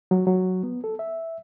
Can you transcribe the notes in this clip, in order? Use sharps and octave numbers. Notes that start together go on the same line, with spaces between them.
F#3
F#3
B3
A4
E5